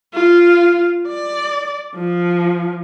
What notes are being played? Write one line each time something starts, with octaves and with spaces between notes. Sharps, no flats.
F4
D5
F3